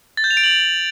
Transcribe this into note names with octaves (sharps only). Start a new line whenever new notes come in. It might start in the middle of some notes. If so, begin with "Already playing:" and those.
A6
G6
F7
D7
F#7